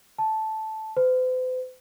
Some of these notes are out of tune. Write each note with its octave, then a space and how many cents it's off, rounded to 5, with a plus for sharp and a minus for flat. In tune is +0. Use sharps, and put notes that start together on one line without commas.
A5 -10
C5 -45